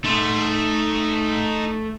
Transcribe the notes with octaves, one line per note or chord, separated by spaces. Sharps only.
A3 D#4 C6